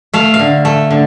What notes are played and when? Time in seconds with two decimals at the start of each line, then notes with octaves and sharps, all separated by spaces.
0.14 A3 F5
0.34 F5
0.39 D3
0.65 A3
0.90 D3